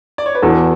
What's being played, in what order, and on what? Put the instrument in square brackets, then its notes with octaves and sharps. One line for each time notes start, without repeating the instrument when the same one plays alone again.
[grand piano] D5
C#5
B4
[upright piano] E2 [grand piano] F#4 A4